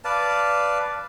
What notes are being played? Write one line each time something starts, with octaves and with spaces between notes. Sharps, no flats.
B4 D5 F5 A5